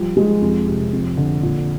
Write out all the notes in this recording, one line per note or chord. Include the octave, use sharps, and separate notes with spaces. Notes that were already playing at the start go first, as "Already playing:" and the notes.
Already playing: F3 G3
G#3
F2
C3
F2
D3
A#2